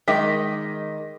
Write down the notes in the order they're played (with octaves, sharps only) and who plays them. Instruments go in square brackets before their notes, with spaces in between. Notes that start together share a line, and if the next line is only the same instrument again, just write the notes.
[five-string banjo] D#3 G#3 [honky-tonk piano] D#5 D6 B6